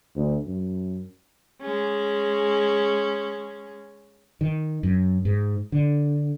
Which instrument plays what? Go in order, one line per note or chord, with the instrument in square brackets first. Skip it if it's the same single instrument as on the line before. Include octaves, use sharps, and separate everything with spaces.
[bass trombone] D2
F#2
[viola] G#3 C#4
[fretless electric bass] D#3
F#2
G#2
D3